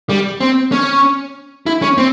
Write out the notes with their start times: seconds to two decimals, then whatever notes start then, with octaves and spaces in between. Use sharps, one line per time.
0.10 G3
0.40 C4
0.72 C#4
1.66 E4
1.82 C#4
1.98 C4